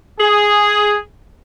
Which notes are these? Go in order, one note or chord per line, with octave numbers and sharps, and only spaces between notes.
G#4